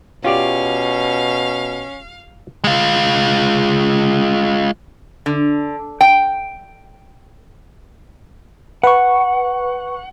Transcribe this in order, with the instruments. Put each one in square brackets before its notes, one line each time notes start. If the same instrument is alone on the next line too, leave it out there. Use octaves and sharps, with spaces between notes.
[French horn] B2 [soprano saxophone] C#4 [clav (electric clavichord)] F4 G4 D5 [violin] F5
[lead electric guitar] G#3 F4
[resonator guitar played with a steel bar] D3
G5
[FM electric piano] B4 C#6 [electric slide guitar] F#5